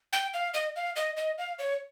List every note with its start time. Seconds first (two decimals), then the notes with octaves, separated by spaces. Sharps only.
0.13 G5
0.34 F5
0.54 D#5
0.76 F5
0.96 D#5
1.17 D#5
1.38 F5
1.59 C#5